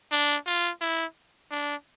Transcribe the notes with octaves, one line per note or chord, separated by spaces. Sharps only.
D4
F4
E4
D4